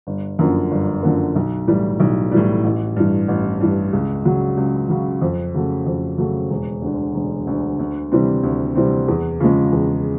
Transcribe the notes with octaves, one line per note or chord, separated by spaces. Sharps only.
G1
F#2 D3 F3 A#3
G1
F#2 D3 F3 A#3
B1
A2 E3 G3
B1
A2 E3 G3
A1
G2 E3
A1
G2 E3
C#2
C#3 F#3
C#2
C#3 F#3
F2
C#3 F#3 A3
F2
C#3 F#3 A3
E1
D2 D3
E1
D2 D3
D2
C3 E3 G3 C4
D2
C3 E3 G3 C4
E2
C#3 F3 G#3
E2